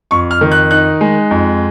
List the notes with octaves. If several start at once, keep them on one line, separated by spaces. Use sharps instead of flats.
F2 C#6
F6
D#3
F#6
D#4 F#6
G#3
F2